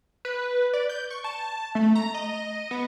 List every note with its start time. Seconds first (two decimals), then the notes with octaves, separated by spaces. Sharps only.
0.25 B4
0.73 D5
0.89 G6
1.10 C#6
1.24 A5
1.75 A3
1.95 A#5
2.14 D#5
2.71 B3